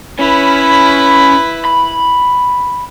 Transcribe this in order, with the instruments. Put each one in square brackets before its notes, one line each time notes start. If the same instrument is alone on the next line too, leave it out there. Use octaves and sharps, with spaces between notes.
[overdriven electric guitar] C#4 [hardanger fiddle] E4 B4
[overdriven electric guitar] B5